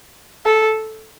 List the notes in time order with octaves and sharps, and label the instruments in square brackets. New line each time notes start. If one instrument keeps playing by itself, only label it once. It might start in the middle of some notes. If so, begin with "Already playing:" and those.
[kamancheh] A4